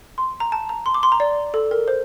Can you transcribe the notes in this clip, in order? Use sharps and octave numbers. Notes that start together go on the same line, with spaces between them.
C6
A#5
A5
A#5
C6
D6
C6
A#5
D5
A4
A#4
C5